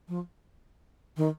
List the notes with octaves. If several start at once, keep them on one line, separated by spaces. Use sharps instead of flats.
F3
D#3